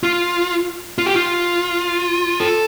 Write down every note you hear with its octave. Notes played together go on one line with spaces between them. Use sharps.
F4
F4
G4
F4
A4